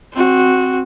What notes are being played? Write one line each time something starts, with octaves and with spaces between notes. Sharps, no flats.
C4 F#4